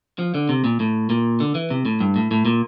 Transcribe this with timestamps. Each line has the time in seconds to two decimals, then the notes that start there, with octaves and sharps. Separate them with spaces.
0.19 F3
0.34 D3
0.49 C3
0.64 A#2
0.80 A2
1.10 A#2
1.40 D3
1.55 E3
1.70 C3
1.85 A2
2.00 G2
2.16 A2
2.31 A2
2.45 A#2